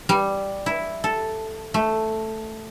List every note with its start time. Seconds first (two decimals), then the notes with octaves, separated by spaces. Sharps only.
0.09 G3
0.66 E4
1.04 A4
1.74 A3